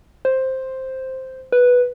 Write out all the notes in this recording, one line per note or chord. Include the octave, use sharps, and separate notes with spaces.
C5
B4